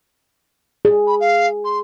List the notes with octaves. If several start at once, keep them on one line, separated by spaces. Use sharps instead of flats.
G#4
B5
F5
C6